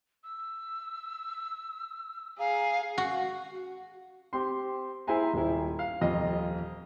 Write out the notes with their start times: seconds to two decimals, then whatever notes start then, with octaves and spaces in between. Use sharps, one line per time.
0.24 E6
2.39 G#4 F5 A#5
2.98 F#4
4.33 C4 G4 C6
5.07 E4 G#4 C5 E5 G#5 A#5
5.33 D#1 E4
5.79 F5
6.01 D#1 F2 F4 D#5